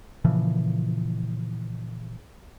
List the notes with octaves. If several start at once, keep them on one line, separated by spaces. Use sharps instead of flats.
A#2 C#3 E3 F3